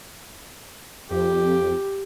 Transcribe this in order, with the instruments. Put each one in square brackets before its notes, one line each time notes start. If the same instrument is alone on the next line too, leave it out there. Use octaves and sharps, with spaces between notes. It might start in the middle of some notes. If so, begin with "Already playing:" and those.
[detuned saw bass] F2 [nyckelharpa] G4